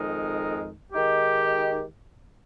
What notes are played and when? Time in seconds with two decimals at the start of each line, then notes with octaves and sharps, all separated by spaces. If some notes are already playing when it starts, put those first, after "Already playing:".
Already playing: F2 D#3 G#3 D#4 A#4
0.93 D#3 G#3 D#4 G4